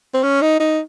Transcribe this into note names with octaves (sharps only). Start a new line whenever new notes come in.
C4
C#4
D#4
D#4